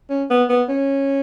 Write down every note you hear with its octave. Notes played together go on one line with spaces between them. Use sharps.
C#4
B3
B3
C#4